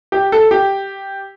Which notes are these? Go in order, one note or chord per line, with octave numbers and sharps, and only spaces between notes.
G4
A4
G4